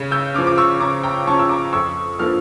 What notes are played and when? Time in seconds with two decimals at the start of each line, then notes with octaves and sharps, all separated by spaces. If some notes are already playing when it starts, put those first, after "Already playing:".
Already playing: C#3
0.11 E6 G6
0.34 C#4 D6 F6
0.38 F3
0.47 D6
0.58 C#6 E6
0.80 C#3 A#5 D6
1.03 G5 A#5
1.27 F3 C#4 A5 C#6
1.39 E6
1.49 A#5 D6
1.73 F2 C#6 E6
2.19 D3 F3 A#3 F6